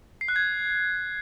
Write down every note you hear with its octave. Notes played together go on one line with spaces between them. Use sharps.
C7
F#6
G#6